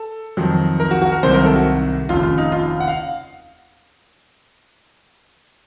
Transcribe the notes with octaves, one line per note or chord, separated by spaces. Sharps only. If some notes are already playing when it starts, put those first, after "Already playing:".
Already playing: A4
F2 D#3 F#3
A#4
F#4
F#4
A#4
C2 C3 D#3 F#3 A#3 C5
A#4
A4
F#4
F1 D#2 C#3 F4
F4
D#4
F4
F#5
F5